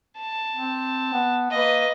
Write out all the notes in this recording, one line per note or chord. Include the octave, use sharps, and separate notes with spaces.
A5
C4
B3
A#3 B4 D#5